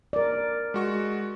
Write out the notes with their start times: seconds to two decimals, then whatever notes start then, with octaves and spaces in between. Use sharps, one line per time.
0.13 A#4 D5
0.74 G#3 F#4 C#6